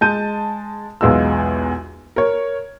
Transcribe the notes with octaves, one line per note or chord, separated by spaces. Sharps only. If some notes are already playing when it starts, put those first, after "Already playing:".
G#3 A5 G6 D#7
B1 E2 G#3 F4 E6
A#4 C#5